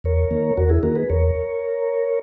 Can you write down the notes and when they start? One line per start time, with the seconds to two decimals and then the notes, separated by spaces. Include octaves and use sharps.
0.04 E2 A#4 C#5
0.31 D#3 A#3
0.57 E2 F#4 A#4
0.69 E4 G#4
0.83 D#3 A#3 F#4 A#4
0.95 G#4 B4
1.10 E2 A#4 C#5